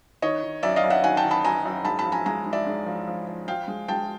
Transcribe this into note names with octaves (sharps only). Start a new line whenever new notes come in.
D#3 C#5 D#5
D#3
F#2 D5 E5
D#5 F5
F#2
E5 F#5
D#3 F#5 G#5
G5 A5
D#3
A5 B5
F#2 G#5 A#5
F#2
G#2 A5 B5
A5 B5
F3
G#5 A#5
G#3 G#5 A#5
G#2
D5 E5
G#2
F3
F3
F3
F3 F5 G5
G#3
G#3 G5 A5